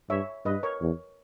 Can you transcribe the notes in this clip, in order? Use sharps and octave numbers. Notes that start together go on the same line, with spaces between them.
G2 C#5 E5
G2 B4 D#5
A#4 C#5
E2